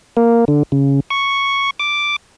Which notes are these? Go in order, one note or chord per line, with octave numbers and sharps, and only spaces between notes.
A#3
D3
C#3
C#6
D6